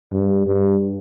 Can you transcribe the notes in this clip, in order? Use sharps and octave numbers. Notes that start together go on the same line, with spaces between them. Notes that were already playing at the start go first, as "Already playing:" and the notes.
G2
G2